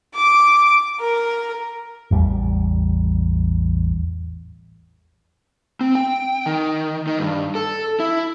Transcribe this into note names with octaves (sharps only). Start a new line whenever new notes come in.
D6
A#4
A1 E2 G3
C4
G5
D#3
D#3
G2
A4
E4